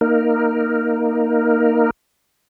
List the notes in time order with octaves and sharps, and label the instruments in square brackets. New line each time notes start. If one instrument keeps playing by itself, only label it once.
[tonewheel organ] A#3 D#4 A#4